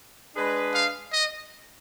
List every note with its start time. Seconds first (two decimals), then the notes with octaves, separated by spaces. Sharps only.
0.36 G#3 D4 G#4 B4
0.75 F5
1.13 D#5